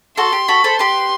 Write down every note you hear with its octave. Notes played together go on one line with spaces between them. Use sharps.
F#4 A4 C6
G4
F#4 A4 B5
A4 C5
G4 B4 C6